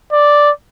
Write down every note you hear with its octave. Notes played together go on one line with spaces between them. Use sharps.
D5